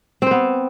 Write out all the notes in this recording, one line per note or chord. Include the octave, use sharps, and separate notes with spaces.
B3 C4 C5